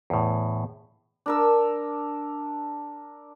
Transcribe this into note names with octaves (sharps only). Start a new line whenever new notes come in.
E2 A2
D4 A#4 E6